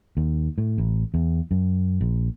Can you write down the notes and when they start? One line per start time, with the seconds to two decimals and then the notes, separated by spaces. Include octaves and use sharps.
0.17 D#2
0.58 A2
0.78 A1
1.14 E2
1.51 F#2
2.01 A#1